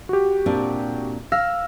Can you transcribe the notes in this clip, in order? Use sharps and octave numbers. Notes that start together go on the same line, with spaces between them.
F#4 G4
A#2 C4 D4
F5 E6 F6 A#6